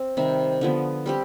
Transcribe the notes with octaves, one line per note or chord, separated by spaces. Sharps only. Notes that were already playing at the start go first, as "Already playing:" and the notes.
Already playing: C4
C3 D#3 G3
D3 F3 B3
G3 C4 G4